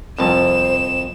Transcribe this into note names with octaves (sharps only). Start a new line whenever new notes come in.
C2 F2 C5 A5 E7